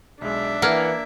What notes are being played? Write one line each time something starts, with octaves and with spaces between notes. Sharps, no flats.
B1 G#3 D4 E5
E3 A#3 F#5 F6 G#6